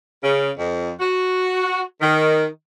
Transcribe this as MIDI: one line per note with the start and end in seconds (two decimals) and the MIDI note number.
0.24 0.50 49
0.58 0.92 41
1.00 1.82 66
2.01 2.46 51